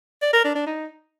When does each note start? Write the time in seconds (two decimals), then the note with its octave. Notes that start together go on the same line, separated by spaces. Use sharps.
0.22 D5
0.33 A#4
0.44 D4
0.55 D4
0.66 D#4